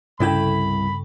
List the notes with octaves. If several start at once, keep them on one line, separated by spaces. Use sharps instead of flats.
C2 G2 C#3 E4 A4 G5 B5